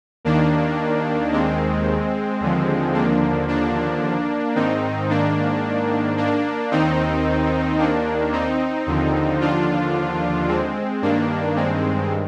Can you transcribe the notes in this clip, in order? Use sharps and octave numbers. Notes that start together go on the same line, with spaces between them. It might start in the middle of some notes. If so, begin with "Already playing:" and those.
D#2 D#3 A#3 D4
G#3 C4
D#2 D3 F3
A#3 D4
A#3 D4
G#2 D#3 C4 D#4
A#3 D4
A#3 D4
D#2 D#3 C4 D#4
A#3 D4
C4 D#4
D#2 D3 F3
D4 F4
G#3 C4
G2 D#3 A#3 D4
G#3 C4